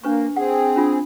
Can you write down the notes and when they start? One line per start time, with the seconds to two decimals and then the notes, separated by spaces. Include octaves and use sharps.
0.04 A#3 D4 B4 C#6
0.36 C4 G#4 F#5
0.76 D4 F4 D#6